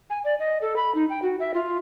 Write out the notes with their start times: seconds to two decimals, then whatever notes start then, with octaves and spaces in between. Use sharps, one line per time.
0.10 G#5
0.24 D5
0.40 D#5
0.62 A4
0.76 B5
0.95 D#4
1.10 G5
1.22 F#4
1.40 E5
1.54 F4